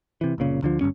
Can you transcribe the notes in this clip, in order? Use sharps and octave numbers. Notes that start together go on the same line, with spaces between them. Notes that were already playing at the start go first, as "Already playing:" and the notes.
C3 E3
F#1 C2 A#2 C#3
D2 D3 F3
G1 C#2 G2 C#4